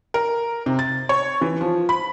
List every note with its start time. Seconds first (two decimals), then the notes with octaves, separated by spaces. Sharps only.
0.14 A#4
0.66 C3
0.79 A6
1.09 C#5
1.41 E3
1.61 F3
1.89 B5